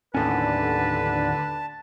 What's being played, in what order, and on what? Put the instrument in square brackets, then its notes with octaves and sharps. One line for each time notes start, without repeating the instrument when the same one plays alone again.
[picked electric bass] D#2 A2 C#4 [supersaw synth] D3 [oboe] B4 [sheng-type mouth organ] A5